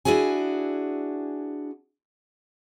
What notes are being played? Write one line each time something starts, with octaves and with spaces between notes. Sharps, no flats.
D4 E4 F#4 G#4 G#5